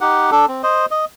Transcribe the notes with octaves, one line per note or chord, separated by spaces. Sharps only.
D#4 G4 F#5
D4 A4
C4
C5 D#5
D#5